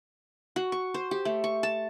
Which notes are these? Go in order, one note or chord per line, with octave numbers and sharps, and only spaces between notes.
F#4
C#6
C5
G4
A3
C#6
A5